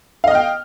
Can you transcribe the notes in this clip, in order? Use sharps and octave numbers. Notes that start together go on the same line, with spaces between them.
D#5 F5 G5 F6